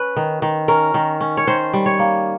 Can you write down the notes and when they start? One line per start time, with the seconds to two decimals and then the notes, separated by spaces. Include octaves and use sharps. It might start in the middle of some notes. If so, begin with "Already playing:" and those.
Already playing: C#4 B4
0.16 D#3
0.42 D#3
0.68 C#4 A#4
0.94 D#3
1.21 C#4
1.37 C#5
1.47 D#3 C5
1.73 G3
1.86 C#5
1.99 A#3